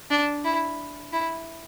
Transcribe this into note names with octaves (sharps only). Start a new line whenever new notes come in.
D4
E4
E4